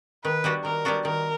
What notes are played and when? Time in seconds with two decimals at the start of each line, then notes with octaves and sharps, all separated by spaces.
0.25 D#3 B4
0.44 G3 B3 D4 F#4
0.65 D#3 A#4
0.85 G3 B3 D4 F#4
1.05 D#3 A#4